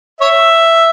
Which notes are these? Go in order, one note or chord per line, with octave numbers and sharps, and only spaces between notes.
C#5 E5